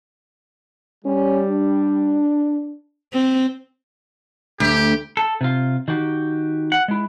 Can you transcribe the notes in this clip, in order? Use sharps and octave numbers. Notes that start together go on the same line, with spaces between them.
G3 C#4
D4
C4
D2 G4
A4
C3 F4
D#3 F#4 G4
F#5
G#3 E4